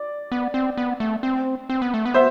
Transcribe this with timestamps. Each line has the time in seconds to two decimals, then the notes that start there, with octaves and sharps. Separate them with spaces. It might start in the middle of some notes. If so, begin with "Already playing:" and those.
Already playing: D5
0.32 B3
0.54 C4
0.77 B3
1.00 A3
1.23 C4
1.70 C4
1.82 B3
1.94 A3
2.05 B3
2.14 C5 E5